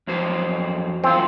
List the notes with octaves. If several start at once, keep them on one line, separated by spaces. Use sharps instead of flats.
F2 F#3 C5
F#2 C4 F4